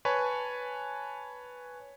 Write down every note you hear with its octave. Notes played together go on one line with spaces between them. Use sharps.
B4 C#5 G#5 A5 B5 C#6